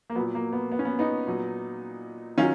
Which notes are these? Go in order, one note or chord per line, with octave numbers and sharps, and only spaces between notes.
A#3
A#2 F#3 B3
A#3
B3
B3
C#4
B3
B3 D#4
A#2 F#3
D#3 F#3 C#4 F4